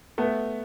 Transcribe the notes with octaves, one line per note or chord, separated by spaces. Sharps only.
A3 B3